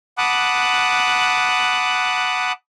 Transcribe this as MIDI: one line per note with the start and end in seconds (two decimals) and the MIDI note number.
0.18 2.52 78
0.18 2.52 81
0.18 2.52 83
0.18 2.52 86
0.18 2.52 87
0.18 2.52 90